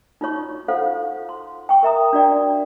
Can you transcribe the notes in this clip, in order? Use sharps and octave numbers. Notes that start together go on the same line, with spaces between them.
D#4 F4 F#4 C#5 C#6
F4 A4 C5 F5 F#5
C6
G5 C#6
A#4 E5 A#5 D#6
D4 F#4 D5 G5